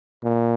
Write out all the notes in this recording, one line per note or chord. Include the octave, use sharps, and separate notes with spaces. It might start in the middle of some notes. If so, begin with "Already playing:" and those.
A#2